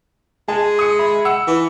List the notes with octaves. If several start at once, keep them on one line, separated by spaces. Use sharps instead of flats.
G#3 G#5 A5
D#6 C#7
E5 B5
F#5 E6 C#7
E3